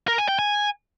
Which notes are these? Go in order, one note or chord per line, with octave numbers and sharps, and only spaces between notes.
A#4
G#5
G5
G#5